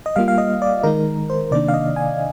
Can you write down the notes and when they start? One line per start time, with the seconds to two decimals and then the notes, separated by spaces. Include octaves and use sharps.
0.06 D#5
0.16 G3 A#3 F4 F5
0.28 F5
0.38 D#5
0.62 D5
0.83 D#3 G#3 D#4 A#4
1.30 C5
1.51 C3 D#3 A#3 D4 D5
1.68 F5
1.74 D#5
1.96 G#5